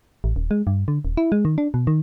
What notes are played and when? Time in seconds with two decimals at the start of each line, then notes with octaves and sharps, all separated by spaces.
0.24 A1
0.36 D#1
0.51 G#3
0.67 G2
0.88 D3
1.05 D#1
1.17 E4
1.32 G#3
1.45 D#3
1.58 D4
1.74 B2
1.87 D#3